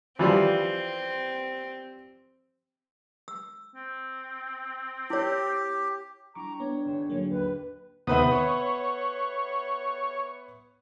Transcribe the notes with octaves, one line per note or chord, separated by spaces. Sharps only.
E3 F3 G3 C4
E6
C4
E4 G4 C#5
G3 D4 E4 A#5 C#6 D6
B3 C#5
G#1 E7
D3 F#3 A#3
D#2 B4
D#2 C3 B3 B4 E5 D#6
C#5